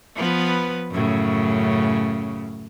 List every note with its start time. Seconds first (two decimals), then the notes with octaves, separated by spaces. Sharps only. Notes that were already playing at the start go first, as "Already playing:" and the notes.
0.15 F3 B3 B4
0.92 F#2 A2 C#3